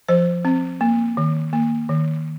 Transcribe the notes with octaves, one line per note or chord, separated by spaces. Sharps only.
F3 C5
C4
A#3
D#3
A#3
D#3